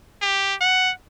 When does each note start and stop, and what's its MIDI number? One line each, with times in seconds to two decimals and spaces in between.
0.22 0.54 67
0.61 0.92 78